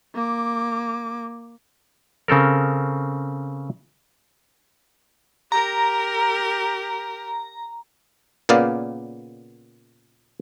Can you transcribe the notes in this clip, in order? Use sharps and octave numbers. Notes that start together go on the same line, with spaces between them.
A#3 D6
C#3 C4 A4 A#4
G4 A#4 A#5
A#2 C#3 A#3 B3 D5 F5